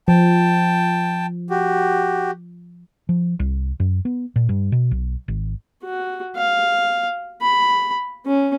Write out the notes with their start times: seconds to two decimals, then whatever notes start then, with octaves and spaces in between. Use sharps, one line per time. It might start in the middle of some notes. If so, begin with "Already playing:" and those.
0.08 F3 G5 A5
1.50 F#4 G4
3.09 F3
3.40 C2
3.80 F#2
4.05 B3
4.36 A#2
4.49 G2
4.72 B2
4.91 B1
5.28 G#1
5.84 F#4
6.36 F5
7.42 B5
8.26 C#4